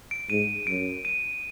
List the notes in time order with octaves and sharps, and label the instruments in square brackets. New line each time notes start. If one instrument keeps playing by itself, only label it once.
[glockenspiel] D7
[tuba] G#2 [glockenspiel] D#7
[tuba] F#2 [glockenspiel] D7
[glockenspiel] D#7